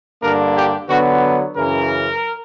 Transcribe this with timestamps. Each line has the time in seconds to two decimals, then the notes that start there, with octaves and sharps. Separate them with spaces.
0.23 G2 D3 A#3 D4 A#4
0.56 G4
0.89 D3 F#3 B3 F#4
1.56 F#2 C#3 E3 A#4